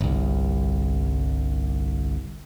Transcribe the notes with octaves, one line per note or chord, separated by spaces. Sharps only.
G1 C2